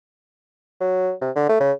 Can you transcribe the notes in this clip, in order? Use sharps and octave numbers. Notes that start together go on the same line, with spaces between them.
F#3
C3
D3
A3
C#3